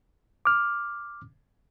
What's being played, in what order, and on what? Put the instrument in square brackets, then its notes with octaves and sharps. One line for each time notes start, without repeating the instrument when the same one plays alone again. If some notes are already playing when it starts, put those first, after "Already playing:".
[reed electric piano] D6 F6